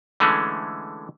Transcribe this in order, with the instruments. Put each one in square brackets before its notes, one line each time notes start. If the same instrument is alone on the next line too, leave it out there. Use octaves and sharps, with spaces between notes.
[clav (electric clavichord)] D3 E3 G#3 A3 C#4